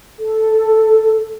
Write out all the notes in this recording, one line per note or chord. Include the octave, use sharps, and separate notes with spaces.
A4